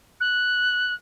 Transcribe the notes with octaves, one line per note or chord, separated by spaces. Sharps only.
F#6